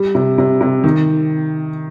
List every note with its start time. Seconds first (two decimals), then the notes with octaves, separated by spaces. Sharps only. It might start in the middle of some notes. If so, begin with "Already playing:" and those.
Already playing: G3
0.15 C3
0.38 C3
0.61 C3
0.84 D#3